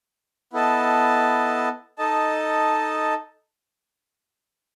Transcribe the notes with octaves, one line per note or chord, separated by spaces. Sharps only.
B3 E4 A4 D#5 A5
D#4 A4 D#5 A5